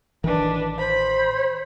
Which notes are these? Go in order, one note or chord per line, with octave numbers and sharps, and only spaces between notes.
A1 D#3 E3 D4 B4
C5 B5